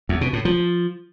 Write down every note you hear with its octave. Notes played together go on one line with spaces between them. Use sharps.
E2
B2
A2
F3